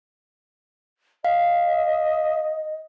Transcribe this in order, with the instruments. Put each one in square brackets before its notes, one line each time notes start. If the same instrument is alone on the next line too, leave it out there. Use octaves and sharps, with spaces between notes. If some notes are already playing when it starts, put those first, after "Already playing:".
[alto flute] D#5 [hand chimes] F5